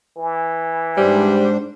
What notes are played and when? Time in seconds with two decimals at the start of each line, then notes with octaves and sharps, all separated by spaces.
0.17 E3
0.97 G#2 G3 D4 C5